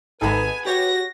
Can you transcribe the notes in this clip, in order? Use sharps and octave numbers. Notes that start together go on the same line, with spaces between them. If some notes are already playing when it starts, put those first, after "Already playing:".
G#1 B3 D#4 G#4 A4 B4 G#5
F#4 G4 C#5 A#6